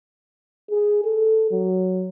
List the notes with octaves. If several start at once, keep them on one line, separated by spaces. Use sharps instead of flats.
G#4
A4
F#3